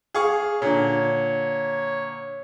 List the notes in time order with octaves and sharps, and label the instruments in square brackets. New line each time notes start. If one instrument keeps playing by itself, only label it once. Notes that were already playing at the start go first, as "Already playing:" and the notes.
[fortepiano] G#4 F5 C#6
[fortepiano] A#2 D3 [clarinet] C#5